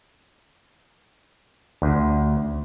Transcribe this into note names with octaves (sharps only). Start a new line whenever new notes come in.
D2